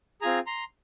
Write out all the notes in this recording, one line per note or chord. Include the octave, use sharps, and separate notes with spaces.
C4 F4 G#4 G#5 A#5
A#5 C6